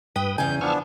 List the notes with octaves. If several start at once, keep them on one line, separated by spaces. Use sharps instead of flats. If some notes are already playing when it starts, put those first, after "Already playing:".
G2 B4 G5 D#6
E2 C#3 G#5 G6
F3 B3 D4 C#6 E6 F6